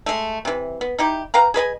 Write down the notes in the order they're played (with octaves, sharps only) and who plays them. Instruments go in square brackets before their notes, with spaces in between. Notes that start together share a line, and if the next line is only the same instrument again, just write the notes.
[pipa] G#3 A3
C3 E3
B3
D#4 E4 G4
B4 F5 G5 A#5
G#4 B4 D#5 G#5